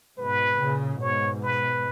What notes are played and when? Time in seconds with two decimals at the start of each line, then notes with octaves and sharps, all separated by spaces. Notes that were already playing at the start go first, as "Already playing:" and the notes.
0.18 G#2 B2 B4
0.60 A#2 C#3
1.02 G#2 B2 C#5
1.44 B4